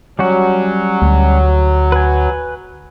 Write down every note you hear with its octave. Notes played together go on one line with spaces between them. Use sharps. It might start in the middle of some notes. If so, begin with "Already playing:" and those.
F#3 G3 C#4 F#4
D2
B4 G#5